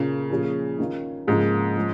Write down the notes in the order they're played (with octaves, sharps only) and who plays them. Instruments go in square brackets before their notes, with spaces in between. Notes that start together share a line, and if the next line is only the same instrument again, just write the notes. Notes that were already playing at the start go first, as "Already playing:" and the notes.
Already playing: [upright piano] A#2 A#3 F4 G#4 [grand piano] C#3
[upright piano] A#2 F3 C#4 G#4
D#3 C#4 F4
[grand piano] G#2 [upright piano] C#3 F3 A#3 F4 G#4
[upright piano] F3 G#3 C#4